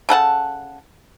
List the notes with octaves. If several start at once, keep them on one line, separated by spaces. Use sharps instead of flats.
C#3 A4 F#5 A5